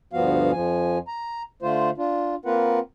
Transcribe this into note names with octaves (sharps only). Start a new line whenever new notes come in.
D2 G2 F3 B3 F#4 F5
F2 F3 G#5
A#5
D3 A3 F4 C5
D4 F4
A#3 C4 F4 A#4 B4 F#5